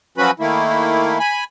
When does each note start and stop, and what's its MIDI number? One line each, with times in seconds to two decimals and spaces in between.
0.18 0.31 53
0.18 0.31 54
0.18 0.31 61
0.18 0.31 66
0.18 0.31 71
0.18 0.31 83
0.40 1.18 51
0.40 1.18 57
0.40 1.18 58
0.40 1.18 64
1.20 1.44 80
1.20 1.44 83